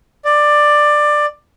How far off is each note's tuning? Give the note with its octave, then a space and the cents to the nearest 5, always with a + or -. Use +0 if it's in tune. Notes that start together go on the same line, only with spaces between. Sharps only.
D5 +15